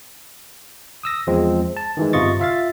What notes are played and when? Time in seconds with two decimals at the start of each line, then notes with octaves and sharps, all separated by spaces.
1.03 D#6 E6 A#6
1.27 E2 F3 G#3 C4
1.77 A5
1.97 D#3 E3 G#3
2.13 G1 C3 F4 D#5 C#6 A6
2.40 F4 E5 F5 A6